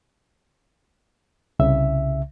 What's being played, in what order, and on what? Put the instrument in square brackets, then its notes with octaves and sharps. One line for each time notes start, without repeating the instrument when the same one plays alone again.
[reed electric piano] C2 C#3 E5